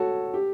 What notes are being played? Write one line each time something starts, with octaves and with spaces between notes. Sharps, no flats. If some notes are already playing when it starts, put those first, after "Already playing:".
Already playing: F#4 A4 C#5
G4